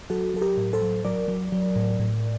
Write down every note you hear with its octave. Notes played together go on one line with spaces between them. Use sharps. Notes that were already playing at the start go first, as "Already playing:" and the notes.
F#3 F#4 A4
F#3 A4
G4 A#4
A2
A4 C5
F#3
F#3 A#4 D5
F#3
F#3
A2
A2